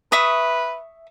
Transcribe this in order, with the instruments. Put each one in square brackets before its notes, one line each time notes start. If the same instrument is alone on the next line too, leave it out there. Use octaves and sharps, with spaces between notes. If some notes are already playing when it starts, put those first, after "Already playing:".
[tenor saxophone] B4 [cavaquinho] E5 C#6 D#6